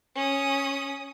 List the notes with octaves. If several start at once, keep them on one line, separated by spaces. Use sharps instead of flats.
C#4 D#6